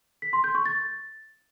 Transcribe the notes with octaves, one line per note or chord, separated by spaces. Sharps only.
B6
C6
G6
C#6
A6